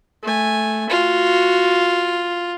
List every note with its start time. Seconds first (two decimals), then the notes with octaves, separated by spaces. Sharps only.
0.23 A3 G#5
0.90 F4 F#4